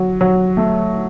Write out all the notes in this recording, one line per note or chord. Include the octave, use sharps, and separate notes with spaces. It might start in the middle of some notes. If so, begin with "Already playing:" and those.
Already playing: F#3
F#3
A3